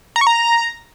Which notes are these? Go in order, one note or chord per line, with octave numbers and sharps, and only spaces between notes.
A#5
C#6
A#5